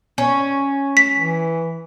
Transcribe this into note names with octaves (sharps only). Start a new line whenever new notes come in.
C#4
B6
E3